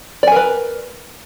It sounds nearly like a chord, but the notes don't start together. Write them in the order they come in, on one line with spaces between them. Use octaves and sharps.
D5 G#5 A#4 B4